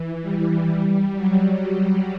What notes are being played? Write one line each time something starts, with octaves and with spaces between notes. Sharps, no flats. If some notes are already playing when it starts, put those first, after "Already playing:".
Already playing: E3
G3
G3
F#3